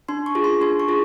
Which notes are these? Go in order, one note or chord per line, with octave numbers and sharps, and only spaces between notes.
D4 C6
C#6
F4 G#4
C6
D4 C6
C#6
F4 G#4